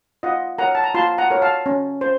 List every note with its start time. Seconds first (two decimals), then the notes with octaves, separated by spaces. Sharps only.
0.23 F4 D#5 F#5
0.59 A#4 C#5 F#5 A#5
0.75 A5
0.84 A#5
0.94 F4 A5 C6
1.18 F#5 A#5
1.30 A#4 C#5
1.42 F5 A5
1.66 C#4
2.01 C5